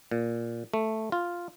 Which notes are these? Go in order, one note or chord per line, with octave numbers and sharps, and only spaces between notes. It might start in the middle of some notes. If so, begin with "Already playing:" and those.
A#2
A3
F4